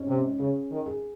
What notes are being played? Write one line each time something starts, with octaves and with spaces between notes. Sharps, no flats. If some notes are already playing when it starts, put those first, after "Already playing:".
Already playing: G#2 C#4
C3
C#3 G#4
D#3
G#4